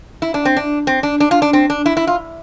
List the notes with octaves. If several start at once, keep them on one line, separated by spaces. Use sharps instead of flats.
E4
D4
C4
D4
C4
D4
D4
F4
D4
C4
D4
E4
E4
F4